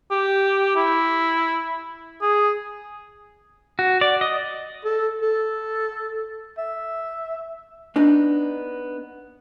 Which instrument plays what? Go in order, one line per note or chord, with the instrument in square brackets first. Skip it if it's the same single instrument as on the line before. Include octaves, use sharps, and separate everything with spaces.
[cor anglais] G4
E4
G#4
[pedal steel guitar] F#4
D5
D#5
[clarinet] A4
A4
E5
[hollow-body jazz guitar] B3 D4 D#4